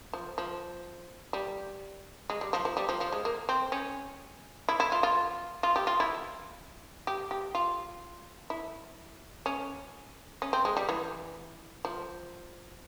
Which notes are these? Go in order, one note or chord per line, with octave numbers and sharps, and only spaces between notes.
F3
F3
G3
G#3
G3
F3
F3
G3
F3
F3
G#3
A#3
C4
C#4
E4
E4
F4
F4
F4
G4
F4
E4
G4
G4
F4
E4
C#4
C#4
C4
G#3
G3
E3
F3